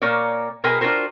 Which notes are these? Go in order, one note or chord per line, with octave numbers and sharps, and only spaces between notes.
A#2 A#3 A#4 C#5 D5
B2 G#4 A#4 B4 G5 G#5
D4 F4 F#4 A#4 C5